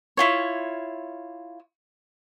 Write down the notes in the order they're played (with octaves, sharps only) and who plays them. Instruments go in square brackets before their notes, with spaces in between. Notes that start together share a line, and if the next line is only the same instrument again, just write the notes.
[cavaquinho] E4 F4 C#5